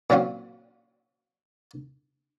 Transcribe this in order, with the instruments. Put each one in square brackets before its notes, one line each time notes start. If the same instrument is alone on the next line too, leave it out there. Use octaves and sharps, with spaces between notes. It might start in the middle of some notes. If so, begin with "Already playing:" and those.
[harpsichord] A#2 F#3 C4 C#4 F4 F#4